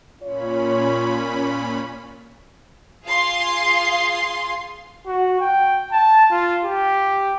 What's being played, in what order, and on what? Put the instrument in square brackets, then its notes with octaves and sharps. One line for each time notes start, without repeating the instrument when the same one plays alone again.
[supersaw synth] A#2 C#4 B5 [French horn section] F4 C#5
[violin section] F4 G#4 F5 C6
[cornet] F#4
G5
A5
F4
G4